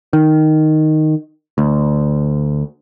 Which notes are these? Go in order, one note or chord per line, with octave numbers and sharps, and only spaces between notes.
D#3
D2